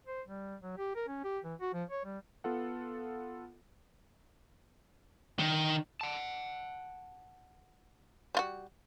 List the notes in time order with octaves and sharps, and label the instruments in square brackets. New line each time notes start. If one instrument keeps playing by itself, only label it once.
[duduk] C5
G3
F#3
G4
A#4
C#4
G4
E3
F#4
F3
C#5
G3
[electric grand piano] B3 F4 A4 F#5
[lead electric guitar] D#3
[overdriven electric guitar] F#5 A5
[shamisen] G3 F4 F#4